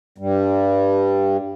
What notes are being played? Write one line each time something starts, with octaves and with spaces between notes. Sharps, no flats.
G2 G3